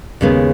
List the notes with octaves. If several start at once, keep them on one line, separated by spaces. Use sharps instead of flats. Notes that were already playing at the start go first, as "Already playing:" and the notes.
D#2 C#3 G#3 B3 C#4